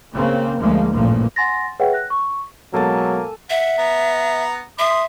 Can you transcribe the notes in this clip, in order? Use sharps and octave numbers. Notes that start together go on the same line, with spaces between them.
C#3 A#3 C4
D2 F3 G#3 A#3
A1 G2 A#2 F3 A#3
F#5 G#5 C6 A6 A#6
G#4 B4 C#5 E5 F#5 G5
F#6 A#6
C#6
B2 F#3 G#3 A#3 A4 G#5 A5
E5 F#5
B3 A#5
E5 C6 D#6